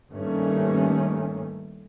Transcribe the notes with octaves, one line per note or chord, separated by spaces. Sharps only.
G2 D#3 A3 A#3 C#4